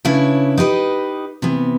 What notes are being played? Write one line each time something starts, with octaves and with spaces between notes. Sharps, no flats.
C#3 D4 E4 B4 C#5
D#4 G4 B4 D#5
C3 E3 B3